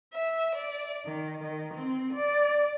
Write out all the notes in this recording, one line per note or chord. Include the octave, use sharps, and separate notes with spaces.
E5
D5
D#3
D#3
C4
D5